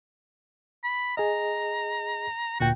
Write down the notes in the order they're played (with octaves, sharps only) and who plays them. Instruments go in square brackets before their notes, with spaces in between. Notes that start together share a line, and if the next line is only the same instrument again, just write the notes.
[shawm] B5
[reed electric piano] G#4 D#5 [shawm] A#5
[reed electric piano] D2 A#2 G5 [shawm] F#4